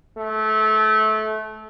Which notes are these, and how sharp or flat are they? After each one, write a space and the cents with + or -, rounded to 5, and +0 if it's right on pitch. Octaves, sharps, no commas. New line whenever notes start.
A3 -20